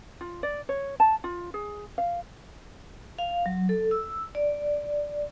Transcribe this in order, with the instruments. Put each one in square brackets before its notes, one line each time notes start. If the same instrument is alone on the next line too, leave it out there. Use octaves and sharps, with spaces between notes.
[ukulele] F4
D5
C#5
A5
F4
G#4
F5
[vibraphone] F5
F#3
A4
E6
D5